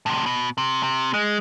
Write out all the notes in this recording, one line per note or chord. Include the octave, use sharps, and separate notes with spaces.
A2 C3
B2
C3
C3
G#3